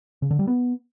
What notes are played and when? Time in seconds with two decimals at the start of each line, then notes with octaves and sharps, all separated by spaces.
0.22 C#3
0.31 D3
0.39 G3
0.47 B3